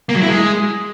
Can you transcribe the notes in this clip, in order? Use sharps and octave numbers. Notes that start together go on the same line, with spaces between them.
A#3
F#3
E4
G#3